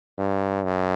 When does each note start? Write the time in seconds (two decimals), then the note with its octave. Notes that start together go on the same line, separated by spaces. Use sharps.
0.18 G2
0.64 F#2